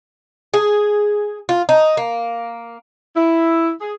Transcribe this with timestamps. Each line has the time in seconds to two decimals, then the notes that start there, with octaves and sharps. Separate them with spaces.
0.54 G#4
1.49 F4
1.69 D#4
1.97 A#3
3.16 E4
3.81 G#4